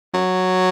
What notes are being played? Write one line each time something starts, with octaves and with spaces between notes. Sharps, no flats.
F#3